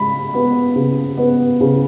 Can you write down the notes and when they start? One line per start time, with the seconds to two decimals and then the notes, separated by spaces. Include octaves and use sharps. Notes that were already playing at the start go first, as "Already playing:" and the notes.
Already playing: C#3 G#3 B5
0.34 B3
0.76 C#3
1.18 B3
1.61 C#3